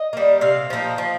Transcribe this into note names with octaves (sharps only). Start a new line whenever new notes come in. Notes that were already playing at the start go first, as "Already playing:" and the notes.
Already playing: D#5
G3 A#3
C3 F5
F3 A#3 D#4
F3